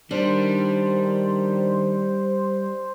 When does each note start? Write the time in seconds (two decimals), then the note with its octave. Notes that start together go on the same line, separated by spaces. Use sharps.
0.11 D#3 G3 D4 C5